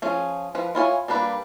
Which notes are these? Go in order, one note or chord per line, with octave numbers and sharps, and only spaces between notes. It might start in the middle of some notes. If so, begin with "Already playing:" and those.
F3 C#4 G#4
F3 B4
E4 F4 C#5 G#5
G3 A#3 D4 B4